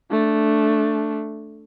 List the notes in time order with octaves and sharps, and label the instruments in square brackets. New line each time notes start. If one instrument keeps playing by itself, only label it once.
[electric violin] A3 D4